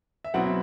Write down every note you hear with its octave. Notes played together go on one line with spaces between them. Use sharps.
E5
B2 F#3 C4 E4 F#5
E5